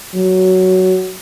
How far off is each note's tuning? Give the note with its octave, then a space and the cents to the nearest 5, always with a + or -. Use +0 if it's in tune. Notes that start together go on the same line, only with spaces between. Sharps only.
F#3 +10